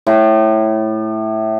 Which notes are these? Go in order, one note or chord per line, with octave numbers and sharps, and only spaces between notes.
A2